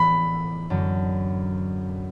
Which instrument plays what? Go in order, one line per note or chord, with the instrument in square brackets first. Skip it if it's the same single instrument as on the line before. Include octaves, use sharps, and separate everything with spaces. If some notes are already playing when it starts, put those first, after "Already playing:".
Already playing: [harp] A2 E3 B3 [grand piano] B5
[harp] F#2 D3 F#3